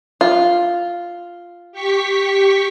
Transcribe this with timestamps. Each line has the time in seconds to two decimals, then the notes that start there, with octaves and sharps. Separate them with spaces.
0.21 F4
1.72 G4 C#6 B6